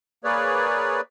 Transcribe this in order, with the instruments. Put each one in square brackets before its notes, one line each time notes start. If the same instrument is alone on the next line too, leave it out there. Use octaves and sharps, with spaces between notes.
[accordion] A#3 G#4 B4 C#5 D5